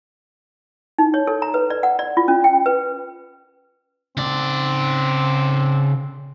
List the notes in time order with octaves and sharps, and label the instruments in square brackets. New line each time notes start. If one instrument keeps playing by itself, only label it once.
[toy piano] D#4
C#5
A4
A#5
B4
D5
F#5
D5
F4
C#4
G5
B4
[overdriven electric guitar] C#3 D5 [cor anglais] C4